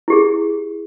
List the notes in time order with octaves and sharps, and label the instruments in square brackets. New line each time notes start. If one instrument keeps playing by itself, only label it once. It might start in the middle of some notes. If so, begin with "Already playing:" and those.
[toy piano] E4 G4 G#4